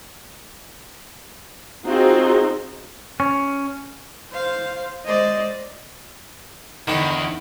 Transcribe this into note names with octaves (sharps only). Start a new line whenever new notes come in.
C4 D#4 F4 F#4 G#4
C#4
C5 F5
G#3 C5 D5 D#5
E2 D3 D#3 D#4